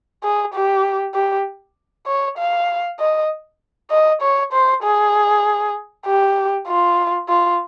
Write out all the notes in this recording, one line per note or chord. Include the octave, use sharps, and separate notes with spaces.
G#4
G4
G4
C#5
F5
D#5
D#5
C#5
C5
G#4
G4
F4
F4